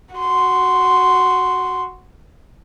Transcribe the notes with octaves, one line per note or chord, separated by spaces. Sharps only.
F#4 C6